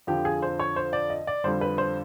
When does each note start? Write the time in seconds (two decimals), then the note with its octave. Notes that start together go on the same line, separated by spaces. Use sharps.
0.07 F2 D3 F3 G4
0.25 G#4
0.42 C5
0.60 C#5
0.76 C5
0.93 D5
1.10 D#5
1.27 D5
1.44 F2 D3 G3 C5
1.61 B4
1.78 C5